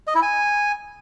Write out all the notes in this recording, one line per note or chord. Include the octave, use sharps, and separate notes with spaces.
D#5
E4
G#5